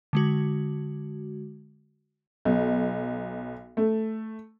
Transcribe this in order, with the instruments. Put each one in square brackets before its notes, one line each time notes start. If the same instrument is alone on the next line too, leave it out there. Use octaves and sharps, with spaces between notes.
[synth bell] D3 G#3 F#4
[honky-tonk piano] B1
A3